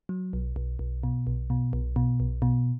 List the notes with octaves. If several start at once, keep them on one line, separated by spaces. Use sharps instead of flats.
F#3
B1
B1
B1
B2
B1
B2
B1
B2
B1
B2